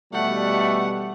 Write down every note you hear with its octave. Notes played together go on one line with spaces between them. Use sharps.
B2 E3 G3 A3 F#5